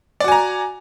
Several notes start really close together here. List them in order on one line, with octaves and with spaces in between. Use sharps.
D5 F#4 G#5 A#5